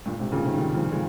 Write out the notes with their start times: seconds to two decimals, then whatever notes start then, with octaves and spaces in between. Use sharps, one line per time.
0.06 G2 A#2
0.19 G#2 C3
0.32 A#2 C#3
0.45 C3 D#3
0.57 D#3 G3
0.74 F3 G#3
0.92 F3 G#3